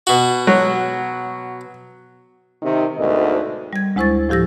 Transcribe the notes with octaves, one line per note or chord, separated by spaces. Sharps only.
B2 F#4
F#3
C3 D#3
D2 G#2 B2 A#4 D#5
G3 G#6
D2 G#3 E4 C5 C#6 A6
A2 F3 G4 E6 A#6